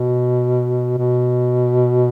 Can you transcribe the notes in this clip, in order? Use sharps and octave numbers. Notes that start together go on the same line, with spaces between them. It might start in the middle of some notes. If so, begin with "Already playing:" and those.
Already playing: B2
B2